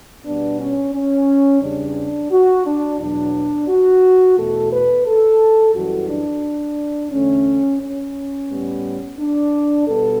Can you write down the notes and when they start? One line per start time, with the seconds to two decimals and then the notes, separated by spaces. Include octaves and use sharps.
0.25 B2 G3 B3 D4
0.59 C#4
0.93 C#4
1.62 E2 C#3 G3 D4
2.31 F#4
2.65 D4
2.99 E2 B2 F#3 D4
3.69 F#4
4.37 E2 B2 A3 A4
4.72 B4
5.06 A4
5.75 F#2 E3 G3 F#4
6.09 D4
7.12 E2 D3 A3 C#4
7.81 C#4
8.50 A2 G3 B3
9.18 D4
9.87 B2 G3 B3 A4